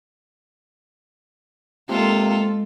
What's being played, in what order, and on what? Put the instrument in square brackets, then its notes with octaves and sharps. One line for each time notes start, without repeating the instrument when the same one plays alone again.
[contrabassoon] C3 [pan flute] G#3 [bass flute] A#3 [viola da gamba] F4 A4